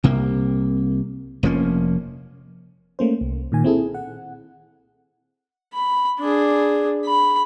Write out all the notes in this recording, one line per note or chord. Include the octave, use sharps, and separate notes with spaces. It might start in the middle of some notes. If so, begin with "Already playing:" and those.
C2 C3 A#3
F1 F3 A#3 C#4
A3 A#3 C#4 C5
C2
A#2 D#3 G#5
C4 E4 G#4 A4
F#5
B5
D4 G#4
B5